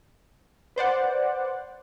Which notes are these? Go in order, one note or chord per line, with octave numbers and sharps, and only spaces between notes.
B4 C5 D5 F#5